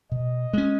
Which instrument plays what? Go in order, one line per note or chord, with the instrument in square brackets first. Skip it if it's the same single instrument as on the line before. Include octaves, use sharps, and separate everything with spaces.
[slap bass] B2 [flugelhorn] D#5
[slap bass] G#3 C#4